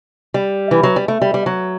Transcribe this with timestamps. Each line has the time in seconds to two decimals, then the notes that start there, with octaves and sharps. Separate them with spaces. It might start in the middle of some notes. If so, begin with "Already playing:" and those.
0.34 G3
0.71 E3
0.83 F#3
0.96 G3
1.08 A3
1.22 G3
1.34 G3
1.46 F#3